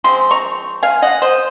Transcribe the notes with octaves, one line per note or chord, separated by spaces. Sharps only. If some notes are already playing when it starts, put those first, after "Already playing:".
F3 G#3 C4 C6
A#5 C#6
F5 G#5
D#5 F#5
C5 D#5